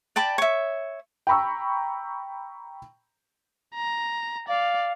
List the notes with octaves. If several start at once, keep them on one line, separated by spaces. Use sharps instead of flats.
D5 G5 A5 B5
C#5 E5
G5 A#5 B5 C#6 E6
A#5
D5 F5